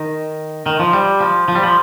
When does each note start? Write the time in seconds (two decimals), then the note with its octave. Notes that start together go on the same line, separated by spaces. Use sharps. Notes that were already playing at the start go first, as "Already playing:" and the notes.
Already playing: D#3
0.66 D#3
0.80 F3
0.93 G3
1.21 F3
1.48 F3
1.55 G3
1.63 F3